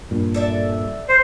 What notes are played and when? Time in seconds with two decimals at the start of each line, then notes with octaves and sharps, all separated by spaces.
0.11 G2 A#2
0.34 A4 D5 E5
1.09 C5